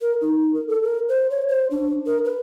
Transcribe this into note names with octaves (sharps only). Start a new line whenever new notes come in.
A#4
D#4
A#4
A4
A#4
C5
C#5
C5
D4
A#4
B4